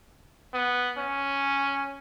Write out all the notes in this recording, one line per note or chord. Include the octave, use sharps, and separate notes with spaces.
B3
C#4